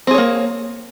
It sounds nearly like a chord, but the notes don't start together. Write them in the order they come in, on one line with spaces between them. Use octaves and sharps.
C4 G#4 C#5 A#3